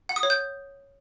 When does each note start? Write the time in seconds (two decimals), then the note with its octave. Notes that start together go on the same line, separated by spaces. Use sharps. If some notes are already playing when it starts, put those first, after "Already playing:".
0.09 F#5
0.16 D#6
0.23 C#5
0.30 G6